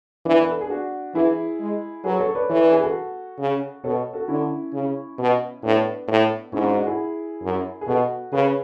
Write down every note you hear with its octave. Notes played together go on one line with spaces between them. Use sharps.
E3 B3 D4
B4
A4
G#4
D4 F#4
E3 E4 G#4
G#3
F#3 G#4 B4
A4 C#5
B4 D5
E3 A4 C#5
B4 D5
G#4 B4
F#4 A4
C#3
B2 A4 C#5
F#4 A4
D3 C#4 E4
C#3
B2
A2 B3 D4
A2
G#2 C#4 E4
D4 F#4
D4 F#4
E4 G#4
F#2
G#4
B2 F#4 A4
C#3 G#4 B4